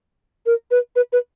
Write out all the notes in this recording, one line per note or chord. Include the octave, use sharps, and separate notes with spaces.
A#4
B4
B4
B4